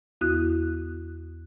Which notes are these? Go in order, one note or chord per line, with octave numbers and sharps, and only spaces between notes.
E2 B3 E4 F#4 D#6 F#6